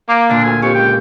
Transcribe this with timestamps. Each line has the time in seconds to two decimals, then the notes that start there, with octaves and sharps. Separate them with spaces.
0.09 A#3 D6
0.29 A#2 D3 D4
0.44 D2 G#5
0.62 F2 G4 C#6
0.75 C#2 G5